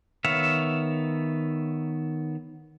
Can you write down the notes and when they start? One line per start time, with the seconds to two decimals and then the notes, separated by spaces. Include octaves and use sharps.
0.25 D#3 B3 C#5 E5 F5